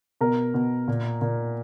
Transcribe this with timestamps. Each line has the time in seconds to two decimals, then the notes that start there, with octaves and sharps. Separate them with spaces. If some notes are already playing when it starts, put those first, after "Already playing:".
0.21 B2 A#4
0.54 B2
0.88 A#2
1.22 A#2